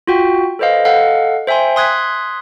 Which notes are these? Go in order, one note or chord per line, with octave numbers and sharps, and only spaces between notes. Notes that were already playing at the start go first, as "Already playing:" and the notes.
F4 F#4 G5
A4 B4 C5 D#5 F5
A4 D#5 F5 F#5
C5 E5 G5 G#5 C6
C6 D#6 F#6 G#6 B6